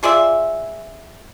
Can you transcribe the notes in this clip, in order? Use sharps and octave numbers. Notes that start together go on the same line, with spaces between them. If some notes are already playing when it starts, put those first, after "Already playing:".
F4 G#4 D5 E5